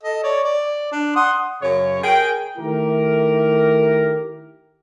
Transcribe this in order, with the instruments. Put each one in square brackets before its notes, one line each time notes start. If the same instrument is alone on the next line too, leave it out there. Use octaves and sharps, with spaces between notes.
[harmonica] A4 D#5
C#5 D5
D5
D4
F#5 C6 D#6
[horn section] F#2 C#3 C#5
G#4 A#4 G5
[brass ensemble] D#3 A3 E4 G4 A#4